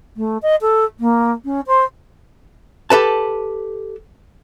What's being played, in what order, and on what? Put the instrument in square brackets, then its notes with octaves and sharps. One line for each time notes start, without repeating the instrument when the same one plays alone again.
[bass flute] A3
D#5
A4
A#3
C#4
C5
[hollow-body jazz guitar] G4 A4 B4 A5